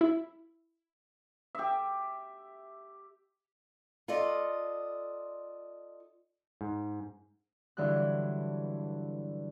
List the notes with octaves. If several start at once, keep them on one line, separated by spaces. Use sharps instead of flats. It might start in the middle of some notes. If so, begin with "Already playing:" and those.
E4
G4 E5
F4 A4 D5 D#5
G#2
G2 D3 E3 F#3 F#6